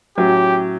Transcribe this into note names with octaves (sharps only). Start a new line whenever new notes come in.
A2 F#3 C#4 F#4 G4